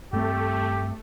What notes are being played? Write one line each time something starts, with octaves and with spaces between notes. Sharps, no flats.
G2 A3 C4 G4